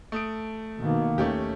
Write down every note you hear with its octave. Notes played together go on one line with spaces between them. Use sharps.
A3 D#6 D7
B2 D#3 A#3
D#2 A3 C#4 G4